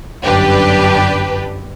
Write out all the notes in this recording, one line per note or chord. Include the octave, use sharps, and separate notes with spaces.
G1 F#2 D4 G4 B4